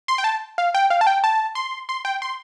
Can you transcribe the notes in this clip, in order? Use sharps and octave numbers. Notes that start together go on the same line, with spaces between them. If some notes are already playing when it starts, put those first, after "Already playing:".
C6
G5
A5
F5
G5
F5
A5
G5
A5
C6
C6
G5
C6